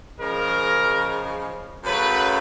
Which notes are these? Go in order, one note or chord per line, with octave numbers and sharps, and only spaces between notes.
C#3 F3 G#3 A#4
F#2 C#3 F#3 A3 B4